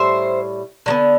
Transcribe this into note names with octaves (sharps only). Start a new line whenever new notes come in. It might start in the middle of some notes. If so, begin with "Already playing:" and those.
Already playing: A2 G3 C5 E5
D3 F#3 B3